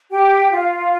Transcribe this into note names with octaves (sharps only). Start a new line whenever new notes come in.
G4 G5
F4 F5